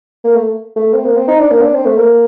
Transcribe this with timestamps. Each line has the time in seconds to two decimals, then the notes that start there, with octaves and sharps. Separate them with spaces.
0.24 A#3
0.35 A3
0.76 A3
0.94 C4
1.05 A#3
1.17 C4
1.28 D#4
1.39 D4
1.51 A#3
1.62 D4
1.74 C4
1.86 A3
1.97 A#3